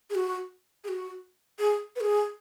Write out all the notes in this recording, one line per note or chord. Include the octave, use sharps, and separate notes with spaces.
G#4
F#4
G#4
F#4
G#4
B4
G#4